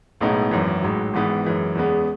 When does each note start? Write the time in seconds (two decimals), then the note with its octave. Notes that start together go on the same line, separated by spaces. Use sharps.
0.21 B1 A2 G#3 B3 D#4
0.51 G#1 F#2 E3
0.82 A1 G#2 F#3
1.13 G#1 G#2 E3 B3
1.45 F#2 E3 G#3
1.75 E2 C#3 G#3 B3